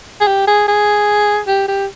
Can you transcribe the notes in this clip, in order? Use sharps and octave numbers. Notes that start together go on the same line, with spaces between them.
G#4
G4
G#4
G#4
G4
G4